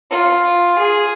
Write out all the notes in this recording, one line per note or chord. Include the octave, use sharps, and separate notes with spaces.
F4
G#4